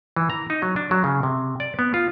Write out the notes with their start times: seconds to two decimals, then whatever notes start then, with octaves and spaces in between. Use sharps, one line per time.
0.16 E3
0.30 A#5
0.50 D#4
0.62 F#3
0.76 D4
0.91 F#3
1.04 C#3
1.23 C3
1.60 D5
1.79 B3
1.94 F4